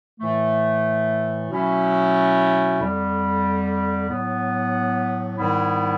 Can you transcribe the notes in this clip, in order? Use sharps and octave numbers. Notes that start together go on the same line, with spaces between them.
A2 E3 A3
B2 F#3 A3 C#4 E4
F2 D3 G3
A2 F#3 B3
G#2 D#3 G3 B3 E4